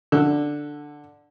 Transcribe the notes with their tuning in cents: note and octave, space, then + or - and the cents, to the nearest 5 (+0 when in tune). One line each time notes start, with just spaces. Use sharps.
D3 +0 E6 +0